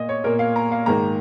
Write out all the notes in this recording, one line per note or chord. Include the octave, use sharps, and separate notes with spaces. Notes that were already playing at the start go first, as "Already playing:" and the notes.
Already playing: A#2 A#3 D#5
C#5
A#2 A#3 A#4
F5
A#5
F5
G#2 D#3 A#3 A#5